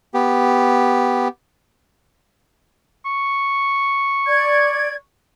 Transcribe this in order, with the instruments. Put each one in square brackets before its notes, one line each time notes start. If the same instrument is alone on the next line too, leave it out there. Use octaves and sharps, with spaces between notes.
[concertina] B3 G4
[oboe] C#6
[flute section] D5 G#6